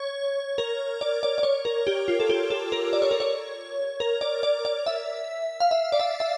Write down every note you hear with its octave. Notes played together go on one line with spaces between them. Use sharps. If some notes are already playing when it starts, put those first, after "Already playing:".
Already playing: C#5
A#4
D5
D5
D5
C#5
A#4
G4
F4
A4
G4
A4
A#4
D5
C#5
A#4
C#5
A#4
D5
D5
D5
E5
F5
E5
D5
E5
E5